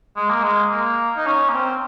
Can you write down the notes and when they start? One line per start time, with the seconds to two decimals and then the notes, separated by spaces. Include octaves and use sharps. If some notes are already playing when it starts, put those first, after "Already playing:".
0.17 G#3
0.29 A#3
0.43 G#3
0.71 A#3
1.17 D#4
1.26 C#4
1.49 A#3
1.54 C4